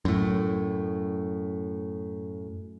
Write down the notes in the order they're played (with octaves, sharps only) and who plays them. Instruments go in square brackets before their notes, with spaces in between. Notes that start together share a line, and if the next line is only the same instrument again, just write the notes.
[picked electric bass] F#2 A2